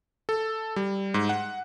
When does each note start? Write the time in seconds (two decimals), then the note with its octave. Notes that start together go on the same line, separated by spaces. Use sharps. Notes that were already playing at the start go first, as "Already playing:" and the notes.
0.29 A4
0.76 G3
1.14 G#2
1.29 F#5